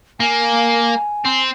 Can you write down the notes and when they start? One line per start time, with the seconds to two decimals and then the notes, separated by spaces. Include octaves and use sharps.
0.20 A#3 G#5
1.25 C4